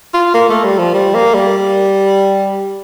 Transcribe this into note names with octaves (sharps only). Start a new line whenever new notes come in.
F4
A#3
A3
G3
F3
G3
A#3
G3